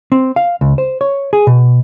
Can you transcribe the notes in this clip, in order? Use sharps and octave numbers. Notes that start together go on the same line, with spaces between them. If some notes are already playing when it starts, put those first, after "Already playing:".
C4
F5
C#2
C5
C#5
G#4
B2